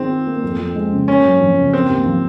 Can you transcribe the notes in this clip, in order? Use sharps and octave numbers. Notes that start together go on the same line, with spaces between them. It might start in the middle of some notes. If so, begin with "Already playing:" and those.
Already playing: D#3 C4 G#4
F4
A#3
F2
F2
G#3
C#3
A#3 C#4
F#2
F3
C#3
A#3 C4
D#2
F3